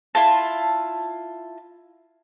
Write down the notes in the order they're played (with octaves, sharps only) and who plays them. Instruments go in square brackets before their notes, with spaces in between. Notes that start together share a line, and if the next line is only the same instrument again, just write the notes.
[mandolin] E4 F4 A5